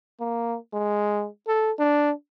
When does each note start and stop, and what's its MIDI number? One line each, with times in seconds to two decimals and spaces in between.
0.20 0.57 58
0.73 1.27 56
1.47 1.72 69
1.78 2.11 62